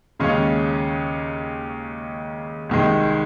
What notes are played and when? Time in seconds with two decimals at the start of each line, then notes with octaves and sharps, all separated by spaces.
0.19 D#2 C#3 G#3 C#4
2.69 C2 C3 D#3 G#3